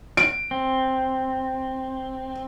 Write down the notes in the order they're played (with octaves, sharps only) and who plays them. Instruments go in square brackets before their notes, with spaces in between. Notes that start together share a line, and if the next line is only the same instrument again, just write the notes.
[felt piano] D7
[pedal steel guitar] C4